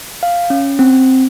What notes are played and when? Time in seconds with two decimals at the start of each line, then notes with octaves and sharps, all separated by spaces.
0.23 F5
0.50 C#4
0.79 C4